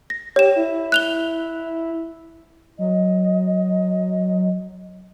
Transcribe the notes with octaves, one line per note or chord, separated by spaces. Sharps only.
A#6
G4 C#5 E7
E4
F#6 F7 G7
F#3 D#5